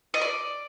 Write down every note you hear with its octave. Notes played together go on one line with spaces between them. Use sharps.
D#5
D5